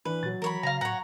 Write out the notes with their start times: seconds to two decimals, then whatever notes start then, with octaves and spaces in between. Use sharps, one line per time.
0.05 E3 D4 B4
0.23 A#2 F#3 A6
0.42 E3 A#4 C#5 B5
0.63 C#3 F5 A#5
0.81 A2 C#5 F#5 A#5